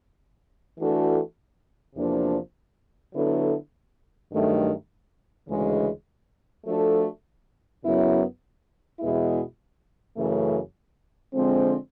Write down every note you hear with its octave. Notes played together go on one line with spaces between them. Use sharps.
E3 A3 D4 F#4 A4
E2 C3 F3 A#3 D4
D3 F#3 B3 E4 A4
G2 D#3 F#3 A3
D2 C#3 E3 G#3
F3 A3 D4 F#4 A4
F#2 C#3 F#3 B3 E4
E2 B2 G#3 B3 E4
F#2 C#3 E3 A3
D3 F3 G#3 C4